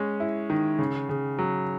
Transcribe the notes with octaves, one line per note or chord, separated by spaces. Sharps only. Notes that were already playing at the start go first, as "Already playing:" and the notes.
Already playing: G#3 C#4
E4
D#3
C#3
C#3
F#3